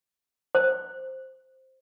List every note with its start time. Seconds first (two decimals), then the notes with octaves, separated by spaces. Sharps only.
0.55 C5